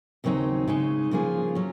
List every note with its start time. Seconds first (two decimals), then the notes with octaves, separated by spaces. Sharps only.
0.24 D#2 C#3 F#3 C4 D#4
0.67 C#3 G#3 D#4
1.11 C#3 F3 A#3 F4 G#4
1.55 F#3 C#4